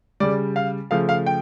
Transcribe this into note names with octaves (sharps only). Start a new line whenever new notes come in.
C#3 G3 D5
F5
C#3 F3 A3 F5
F5
G5